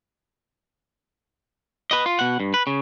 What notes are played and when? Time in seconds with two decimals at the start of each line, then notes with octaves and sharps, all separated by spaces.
1.91 B4 D#5
2.06 F4
2.19 B2 F#5
2.40 G2
2.54 B4
2.67 C#3